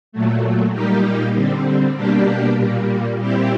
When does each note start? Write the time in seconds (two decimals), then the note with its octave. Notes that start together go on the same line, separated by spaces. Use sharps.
0.12 A#2 F#3 A3
0.73 A#2 G3 A#3 D#4 G4
1.34 D3 G3 C4
1.96 B2 G3 A#3 D4 G4
2.57 A#2 G3 A#3
3.18 A#2 G3 C4 E4 G4